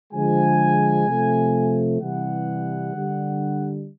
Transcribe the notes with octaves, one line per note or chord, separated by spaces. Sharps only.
D3 F3 G#3 G#5
C3 F3 A3
C3 E3 G3 F#5
D3 G3